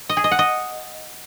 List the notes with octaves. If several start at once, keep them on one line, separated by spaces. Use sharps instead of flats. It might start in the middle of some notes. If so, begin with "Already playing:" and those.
D#5
G#4
D#5
F#5
D#5